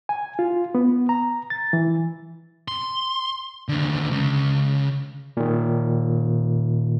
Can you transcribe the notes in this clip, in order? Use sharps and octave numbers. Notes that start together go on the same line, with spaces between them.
G#5
F4
B3
A#5
A6
E3
C6
D#2 D3
C#2 C#3
A#2 D#3